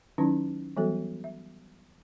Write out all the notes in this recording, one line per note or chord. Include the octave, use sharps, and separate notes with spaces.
D#3 F#3 C#4 D#4 E4 A5
E3 F#3 G3 B3 F#4 A4
E5